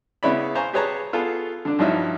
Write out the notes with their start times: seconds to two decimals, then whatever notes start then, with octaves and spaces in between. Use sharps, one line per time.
0.23 C#3 B3 C#4 E4 D5 B5
0.55 C5 F5 G#5 A#5 C#6
0.74 G4 G#4 B4 C#5 A5 A#5
1.13 B3 F4 G#4 A4
1.65 D3 D4
1.79 G2 F3 F#3 D#4 E4